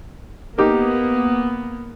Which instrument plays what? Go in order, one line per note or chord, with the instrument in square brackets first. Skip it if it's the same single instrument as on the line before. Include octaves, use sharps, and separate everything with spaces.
[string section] A#3 B3 [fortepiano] D#4 G4 A#4